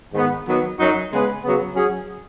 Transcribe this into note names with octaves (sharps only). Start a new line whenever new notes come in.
G#2 D#3 B3
D#3 F#3 B3
F#2 F#3 D#4 F#4
C#3 G#3 B3 G#4 B4
C#3 F#3 B3
F#3 C#4 G#4